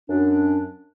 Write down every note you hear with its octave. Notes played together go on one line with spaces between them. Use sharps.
F#2 D4